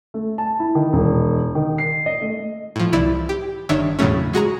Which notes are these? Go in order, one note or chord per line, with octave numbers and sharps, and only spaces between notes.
A3
A5
E4
D#3
E1
D#3
C7
D#5
A3
A2 F3
C2 E3 E4 D5
G4
G1 D#3 D4 C#5 E5
E2 A2 C#3 F#3 A3 C#4
G#3 F#4 G#4 A#5